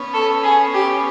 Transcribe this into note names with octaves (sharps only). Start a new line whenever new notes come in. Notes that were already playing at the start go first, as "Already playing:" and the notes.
Already playing: B3 C#4
A4
G#4
G4